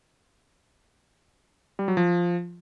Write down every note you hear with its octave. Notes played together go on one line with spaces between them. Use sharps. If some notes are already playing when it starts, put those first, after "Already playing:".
G3
F#3
F3